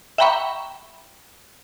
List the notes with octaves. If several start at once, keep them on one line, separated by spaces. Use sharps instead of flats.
E5 F#5 G5 A#5 B5 C#6